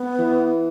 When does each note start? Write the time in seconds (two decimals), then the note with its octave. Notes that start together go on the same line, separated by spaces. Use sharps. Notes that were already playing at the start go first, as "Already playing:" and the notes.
Already playing: B3
0.19 E3